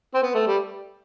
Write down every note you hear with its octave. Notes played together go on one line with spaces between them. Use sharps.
C4
B3
A3
G3